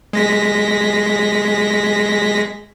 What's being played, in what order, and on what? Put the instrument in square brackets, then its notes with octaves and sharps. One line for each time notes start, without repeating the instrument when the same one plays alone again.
[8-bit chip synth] G#3 A#6 B6